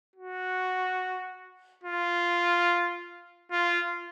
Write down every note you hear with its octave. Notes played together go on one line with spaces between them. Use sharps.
F#4
F4
F4